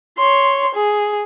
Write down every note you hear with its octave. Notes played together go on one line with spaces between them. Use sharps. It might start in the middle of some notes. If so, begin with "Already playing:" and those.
C#5 C6
G#4